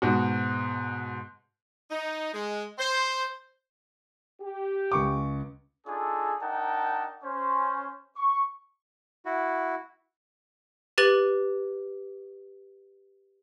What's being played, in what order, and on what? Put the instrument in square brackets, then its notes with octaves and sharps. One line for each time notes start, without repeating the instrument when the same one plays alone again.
[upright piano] G#2 B2 F#4
[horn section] D#4
G#3
C5
[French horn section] G4
[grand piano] C#2 C#6 D6
[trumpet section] D4 D#4 F4 G#4 A4
D4 D#4 A#4 F#5 G5 A5
C#4 C5
C#6
[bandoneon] E4 F#4
[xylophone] G4 B4 A6 D#7 F#7